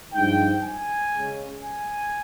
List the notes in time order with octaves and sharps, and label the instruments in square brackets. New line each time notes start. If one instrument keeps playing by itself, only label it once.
[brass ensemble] G2 F3 G#3 D#4 G5
G#5
C#3 G#3 C#4
G#5